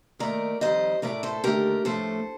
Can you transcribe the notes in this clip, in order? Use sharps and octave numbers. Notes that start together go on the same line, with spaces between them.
D#2 D#3 A3 A#4 D5
F2 D#3 G3 C5 D#5
F3 A3 A#4 D5
A2
A4 C5
D#2 D3 A3 G4 A#4
A2 F3 A3 A4 C5